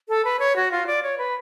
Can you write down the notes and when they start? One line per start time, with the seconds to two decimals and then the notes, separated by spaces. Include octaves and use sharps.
0.09 A4
0.25 B4
0.39 C#5
0.56 F#4
0.72 F4
0.87 D5
1.03 C#5
1.18 B4